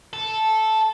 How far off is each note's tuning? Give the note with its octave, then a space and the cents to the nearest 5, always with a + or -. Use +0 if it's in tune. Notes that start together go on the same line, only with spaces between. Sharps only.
A4 -5